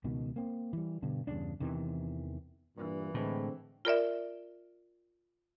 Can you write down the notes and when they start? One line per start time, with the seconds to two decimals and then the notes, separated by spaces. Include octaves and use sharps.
0.04 C#2 B2 D#3
0.36 A#3 C4
0.73 E3 G3
1.02 G2 B2 D3
1.27 E2 G2 C#3 D4
1.60 E2 C3 D#3 E3
2.77 G2 A#2 E3
3.14 A2 D3 G#3 C4
3.85 F4 A#4 D5 E5